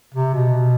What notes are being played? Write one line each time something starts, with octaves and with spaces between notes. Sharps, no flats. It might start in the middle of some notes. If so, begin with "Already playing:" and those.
C3
B2